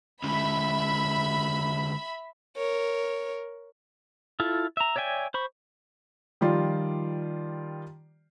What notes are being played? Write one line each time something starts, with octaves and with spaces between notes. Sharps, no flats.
D3 G#3 C#4 E5 B5
A#4 C#5
E4 F4 A4
E5 A#5
C#5 D5 E5 G5 G#5
C5 B5 C#6
D#3 F3 G3 F4 D5 C6